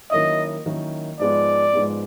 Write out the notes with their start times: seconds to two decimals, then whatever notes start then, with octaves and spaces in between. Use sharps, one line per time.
0.11 D#3 F#3 A#3 C#4 E4 D#5
0.66 D#3 F#3 A#3 C#4 E4
1.19 G#2 F3 G#3 B3 D5
1.73 G#2 F3 G#3 B3